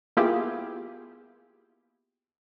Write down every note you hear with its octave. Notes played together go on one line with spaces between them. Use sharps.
A#3 B3 E4 F4 G4 G#4